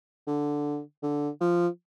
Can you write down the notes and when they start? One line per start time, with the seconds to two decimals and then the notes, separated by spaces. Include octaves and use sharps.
0.27 D3
1.03 D3
1.41 F3